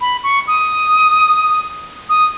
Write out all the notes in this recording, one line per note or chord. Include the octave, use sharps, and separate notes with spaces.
B5
C#6
D#6
D#6